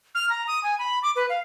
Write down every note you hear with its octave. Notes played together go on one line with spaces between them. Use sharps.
F6
A#5
D#6
G#5
B5
D6
B4
F5